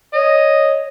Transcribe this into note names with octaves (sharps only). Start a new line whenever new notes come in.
C#5 D#5